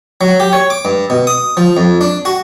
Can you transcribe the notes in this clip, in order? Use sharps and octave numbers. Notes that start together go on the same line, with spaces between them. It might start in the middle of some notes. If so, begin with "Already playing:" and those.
F#3
G4
C#5
D6
G2
B2
D#6
F3
F2
D4
F#4